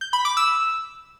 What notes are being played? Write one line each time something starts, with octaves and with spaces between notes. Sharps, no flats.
G6
B5
D6
E6